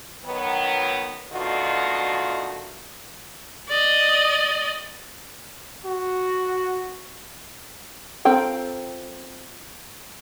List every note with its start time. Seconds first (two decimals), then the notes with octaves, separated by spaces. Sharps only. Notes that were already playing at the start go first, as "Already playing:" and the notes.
0.25 D#3 F#3 B3
1.32 B2 D3 D#3 A3 F4 F#4
3.68 D5 D#5
5.86 F#4
8.25 C4 F4 A4 G5 A#5